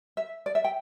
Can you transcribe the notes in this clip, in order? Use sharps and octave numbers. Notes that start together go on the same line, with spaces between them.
E5
D5
E5
G5